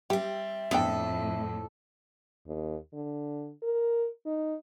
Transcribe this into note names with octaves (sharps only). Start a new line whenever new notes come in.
G3 C4 G4 E5
F2 A2 B3 D4 A4 G5
D#2
D3
A#4
D#4